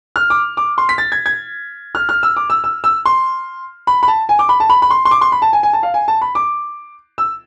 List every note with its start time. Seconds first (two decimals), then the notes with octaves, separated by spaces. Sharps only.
0.16 F6
0.30 D6
0.57 D6
0.78 C6
0.89 B6
0.98 A6
1.12 G#6
1.26 G#6
1.95 F6
2.09 F6
2.23 E6
2.36 D6
2.50 E6
2.64 E6
2.84 E6
3.05 C6
3.87 B5
4.03 B5
4.08 A5
4.29 G#5
4.39 D6
4.49 B5
4.60 A5
4.70 B5
4.82 B5
4.90 C6
5.05 C6
5.11 D6
5.21 C6
5.32 B5
5.42 A5
5.53 G#5
5.63 G#5
5.73 A5
5.83 F5
5.94 G#5
6.08 A5
6.22 B5
6.35 D6
7.18 E6